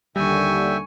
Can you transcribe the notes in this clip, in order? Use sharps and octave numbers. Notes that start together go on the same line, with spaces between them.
D#2 D3 G3 E5 G5 G#5 C#6